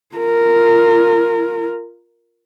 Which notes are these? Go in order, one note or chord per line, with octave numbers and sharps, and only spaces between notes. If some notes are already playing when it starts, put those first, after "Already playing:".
F4 A#4